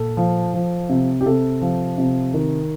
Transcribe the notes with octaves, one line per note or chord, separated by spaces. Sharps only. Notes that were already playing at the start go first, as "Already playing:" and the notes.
Already playing: A#2 A4
F3
F3
C3
G4
C3 A4
F3
C3
D#3